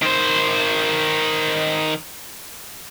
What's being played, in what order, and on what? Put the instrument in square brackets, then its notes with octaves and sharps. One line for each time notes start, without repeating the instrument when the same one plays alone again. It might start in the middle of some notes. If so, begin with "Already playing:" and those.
[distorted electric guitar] D#3 C5